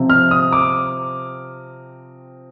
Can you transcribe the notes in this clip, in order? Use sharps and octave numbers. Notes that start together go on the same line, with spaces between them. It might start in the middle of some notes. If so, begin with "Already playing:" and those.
Already playing: C3 F3 C4
F6
D#6
D6